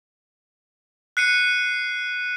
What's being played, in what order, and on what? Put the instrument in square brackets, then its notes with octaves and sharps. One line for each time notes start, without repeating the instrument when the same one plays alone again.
[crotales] F#6 C7 C#7 D#7